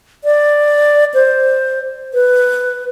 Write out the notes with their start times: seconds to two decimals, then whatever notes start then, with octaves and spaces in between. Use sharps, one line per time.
0.24 D5
1.14 C5
2.14 B4